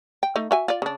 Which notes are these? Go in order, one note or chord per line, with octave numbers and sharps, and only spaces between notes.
G5
A3 D#4
F#4 E5 G#5
F4 D5
C#3 D4